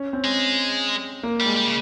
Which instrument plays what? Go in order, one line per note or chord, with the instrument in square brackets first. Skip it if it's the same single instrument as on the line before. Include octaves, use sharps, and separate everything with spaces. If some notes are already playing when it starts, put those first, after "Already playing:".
Already playing: [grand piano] C#4
C4
[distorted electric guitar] G#3
[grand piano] A#3
[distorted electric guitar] G3
[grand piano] G#3
[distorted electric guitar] G3
C#3